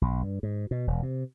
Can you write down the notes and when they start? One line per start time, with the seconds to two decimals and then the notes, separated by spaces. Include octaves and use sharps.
0.02 B1
0.22 G2
0.43 G#2
0.71 B2
0.87 E1
1.03 C3